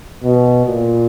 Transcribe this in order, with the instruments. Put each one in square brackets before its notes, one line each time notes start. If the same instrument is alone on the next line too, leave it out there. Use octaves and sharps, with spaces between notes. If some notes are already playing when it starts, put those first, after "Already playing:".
[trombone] B2
A#2